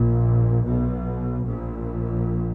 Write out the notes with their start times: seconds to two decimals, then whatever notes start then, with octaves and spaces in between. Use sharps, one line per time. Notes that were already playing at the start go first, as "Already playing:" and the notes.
Already playing: A#1 A#2
0.65 B1 B2
1.45 A#1 A#2